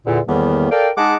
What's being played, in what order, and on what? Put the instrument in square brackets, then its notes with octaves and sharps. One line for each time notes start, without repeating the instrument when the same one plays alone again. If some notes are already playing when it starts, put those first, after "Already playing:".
[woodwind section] E2 A#2 D3
E2 A2 D#3 G3 A#3 B3
A4 A#4 D5 F5 G5
G#3 D#4 G#4 F#5 A5 D6